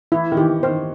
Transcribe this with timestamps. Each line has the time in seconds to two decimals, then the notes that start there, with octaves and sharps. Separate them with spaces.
0.12 E3 E4
0.32 D#3
0.37 E3 G4
0.63 D#3 C5